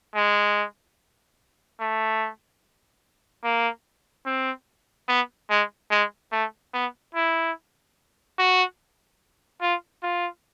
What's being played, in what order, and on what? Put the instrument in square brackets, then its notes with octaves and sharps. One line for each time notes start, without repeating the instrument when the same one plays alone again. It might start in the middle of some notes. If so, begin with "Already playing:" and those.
[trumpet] G#3
A3
A#3
C4
B3
G#3
G#3
A3
B3
E4
F#4
F4
F4